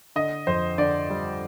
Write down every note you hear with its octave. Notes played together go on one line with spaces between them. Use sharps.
D3 D#5
F2 C5
D3 D5
G3